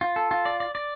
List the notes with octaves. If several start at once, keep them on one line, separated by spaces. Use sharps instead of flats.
F4
A4
F4
D5
D5
D5